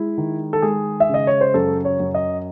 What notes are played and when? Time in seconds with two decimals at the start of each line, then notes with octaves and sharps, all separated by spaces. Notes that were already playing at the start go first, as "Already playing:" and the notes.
Already playing: G#3 E4
0.18 D#3
0.53 A4
0.62 G#3 G#4
1.00 E5
1.09 C#3 D#5
1.27 C#5
1.41 C5
1.54 F#2 A4
1.85 C#5
2.00 F#2
2.14 D#5